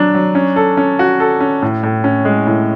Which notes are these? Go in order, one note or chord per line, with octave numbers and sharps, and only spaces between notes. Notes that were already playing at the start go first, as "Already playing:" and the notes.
Already playing: F#3 D4
F#3
C#4
A4
C#4
F#4
A4
C#4
A2
A2
C#4
G#3
A2